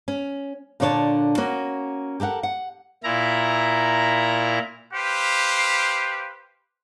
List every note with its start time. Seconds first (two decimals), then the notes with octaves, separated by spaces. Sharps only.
0.08 C#4
0.80 A#2 D3 D4 C#5 D5 A5
1.37 A#3 C#4 F#4
2.20 G4 A4 A#4 F#5
2.43 F#5
3.03 A#2 E4 A#5
4.94 G4 B4 C5 F5